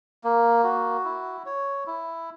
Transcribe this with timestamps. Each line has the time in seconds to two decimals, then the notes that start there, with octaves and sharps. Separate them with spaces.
0.24 A#3
0.64 F#4
1.05 E4
1.46 C#5
1.87 E4